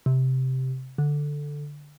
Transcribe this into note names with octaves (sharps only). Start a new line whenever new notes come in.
C3
D3